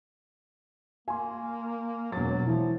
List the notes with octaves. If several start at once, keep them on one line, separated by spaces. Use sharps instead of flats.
A#3 G#5 C6
E1 F#3 A6
E3 F3